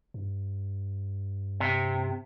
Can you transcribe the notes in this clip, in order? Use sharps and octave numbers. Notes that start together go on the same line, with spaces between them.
G2
C3